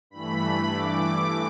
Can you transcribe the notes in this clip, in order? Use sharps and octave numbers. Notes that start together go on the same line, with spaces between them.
G2 E3 A3 B5
G2 E3 A3 D6